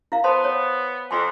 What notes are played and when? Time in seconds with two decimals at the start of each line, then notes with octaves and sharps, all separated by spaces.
0.12 E4 F5
0.24 B3 C5 A5 C6
0.44 C#5
1.11 F2 G#5 C6